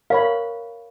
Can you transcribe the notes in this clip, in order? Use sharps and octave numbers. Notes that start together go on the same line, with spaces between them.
A#4 C#5 F5 B5